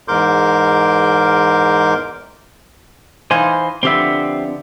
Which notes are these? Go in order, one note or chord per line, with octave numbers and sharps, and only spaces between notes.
E2 G#2 A#4 C6 D6 G6
E3 D#4 C5 F5 G#5
D3 F3 B3 C4 G4 E5